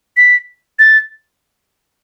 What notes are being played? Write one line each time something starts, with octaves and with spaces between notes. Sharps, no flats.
B6
A6